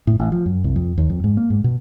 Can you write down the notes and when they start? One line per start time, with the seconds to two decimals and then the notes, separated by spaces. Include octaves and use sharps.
0.07 A2
0.19 A1
0.32 F3
0.46 F#2
0.64 C2
0.76 F2
0.98 D#2
1.10 F2
1.24 G#2
1.37 A#3
1.50 G#2
1.64 B2